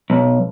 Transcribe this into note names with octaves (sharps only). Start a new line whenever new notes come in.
B1